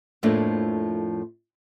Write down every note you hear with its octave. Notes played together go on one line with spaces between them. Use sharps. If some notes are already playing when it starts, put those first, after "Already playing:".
F2 A2 F3 A3 A#3 D4